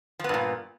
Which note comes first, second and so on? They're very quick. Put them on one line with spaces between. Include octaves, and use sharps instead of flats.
F3 B3 G2 A#2